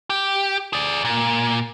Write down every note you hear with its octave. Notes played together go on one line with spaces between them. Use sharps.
G4
G#4 D5
A#2